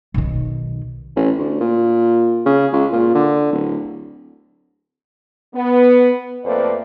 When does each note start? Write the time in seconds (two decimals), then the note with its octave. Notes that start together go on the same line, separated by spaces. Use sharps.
0.14 B1 D#3
1.16 A1
1.38 D2
1.60 A#2
2.46 C#3
2.73 C#2
2.92 A#2
3.15 D3
3.52 D1
5.55 B3
6.45 F2 A3 A#3 B4 C5 D5